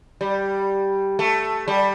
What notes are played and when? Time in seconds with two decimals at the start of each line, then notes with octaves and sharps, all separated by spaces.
0.21 G3
1.19 A3
1.68 G3